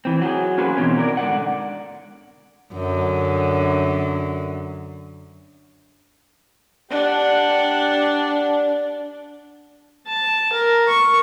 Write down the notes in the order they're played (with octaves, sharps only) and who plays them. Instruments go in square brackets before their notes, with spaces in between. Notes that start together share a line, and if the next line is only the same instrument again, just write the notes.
[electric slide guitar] E3 C4
F#3 G#4
A#3 C#4 F#4 G#4 B4 C5
B2 D#3 E3 C4 C#4
A#4 D5
G#2 D3 D5 F#5
[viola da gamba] F#2 D3
[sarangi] D4 [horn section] G4 F#5
[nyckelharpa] A5
A#4
C#6